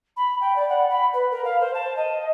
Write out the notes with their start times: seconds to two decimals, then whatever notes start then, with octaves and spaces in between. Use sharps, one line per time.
0.17 B5
0.41 G5
0.56 D5
0.69 F#5
0.90 B5
1.13 B4
1.31 A#4
1.45 F5
1.60 C5
1.74 A5
1.96 D#5